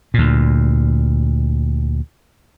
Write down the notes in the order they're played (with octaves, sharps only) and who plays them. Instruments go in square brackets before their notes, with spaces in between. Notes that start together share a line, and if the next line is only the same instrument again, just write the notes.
[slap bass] D2 A#2